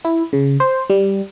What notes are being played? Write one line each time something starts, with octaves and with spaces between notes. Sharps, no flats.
E4
C#3
C5
G3